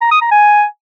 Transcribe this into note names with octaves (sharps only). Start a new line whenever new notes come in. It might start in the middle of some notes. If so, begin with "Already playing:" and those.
A#5
D#6
A#5
G#5